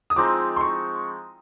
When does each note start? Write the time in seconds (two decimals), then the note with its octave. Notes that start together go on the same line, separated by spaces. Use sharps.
0.10 D#6
0.16 F3 G#3 C4 D#4 D6
0.56 C6
0.61 C#6